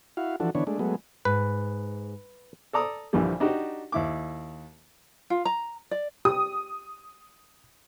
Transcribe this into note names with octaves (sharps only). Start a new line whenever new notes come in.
E4 F#4 F5
E3 F3 D4 F#4 A4
D3 E3 B3 D4 C#5
G#3 A3 D4
F#3 G#3 A3 B3
G#2 B4
A4 D5 A#5 D#6
A#1 D3 E3 F3 G3
D4 D#4 F#4 G4
D#2 E4 D6
F4
A#5
D5
G4 D#6